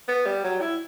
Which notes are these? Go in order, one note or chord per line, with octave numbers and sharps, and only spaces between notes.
B3
G3
F#3
E4